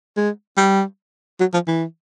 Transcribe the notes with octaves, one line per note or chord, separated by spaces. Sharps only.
G#3
G3
F#3
F3
E3